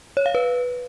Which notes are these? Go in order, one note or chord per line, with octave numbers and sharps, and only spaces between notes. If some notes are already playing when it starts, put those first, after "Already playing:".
C#5
F5
B4